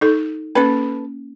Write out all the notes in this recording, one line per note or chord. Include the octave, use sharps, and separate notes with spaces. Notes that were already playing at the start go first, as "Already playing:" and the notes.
D#4 A4
A#3 C#4 A4 B4